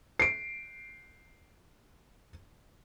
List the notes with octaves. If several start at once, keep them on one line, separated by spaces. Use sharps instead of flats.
C7 D7